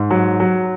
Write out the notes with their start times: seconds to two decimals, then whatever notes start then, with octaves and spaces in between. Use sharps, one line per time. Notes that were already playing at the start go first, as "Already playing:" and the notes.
Already playing: G#2
0.11 F#3
0.40 F#3